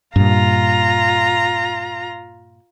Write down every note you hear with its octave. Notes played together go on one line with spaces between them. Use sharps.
G2 A#2 F4 A#5